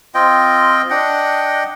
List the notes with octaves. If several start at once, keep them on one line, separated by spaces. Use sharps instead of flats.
C4 F4 D#5 G5
D4 D#5 F#5 G5